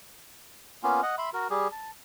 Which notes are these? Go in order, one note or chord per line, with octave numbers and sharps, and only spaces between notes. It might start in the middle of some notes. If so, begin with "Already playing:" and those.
A#3 B3 C#4 F4
D#5 F#5
E5 B5 C6
F#4 A#4
G3 G4 G#4
A5